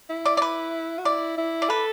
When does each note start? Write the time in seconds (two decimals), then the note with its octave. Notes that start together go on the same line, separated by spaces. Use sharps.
0.10 E4
0.25 D5
0.37 D5
0.42 B4
0.98 F#4
1.05 E4 D5
1.38 E4
1.62 D5
1.70 A4 B4